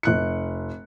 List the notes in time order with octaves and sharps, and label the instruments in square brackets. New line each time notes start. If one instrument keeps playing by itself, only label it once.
[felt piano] F1 F#6 C#7